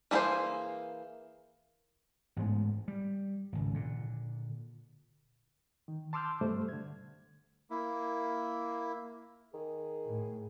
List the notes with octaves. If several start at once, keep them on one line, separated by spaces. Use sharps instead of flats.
E3 A#3 E4 G#4 C5
A1 G#2 G#3 B3
G3
G#1 C#2
A#2 D3
D#3
A5 C6 D6 E6 F6 G6
G2 B2 G3 A3 C5
D3 G#6
A#3 E4
D#3 G#4
A2